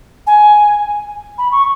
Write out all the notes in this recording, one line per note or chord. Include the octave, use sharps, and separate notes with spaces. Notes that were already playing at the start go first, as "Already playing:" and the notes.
G#5
B5
C#6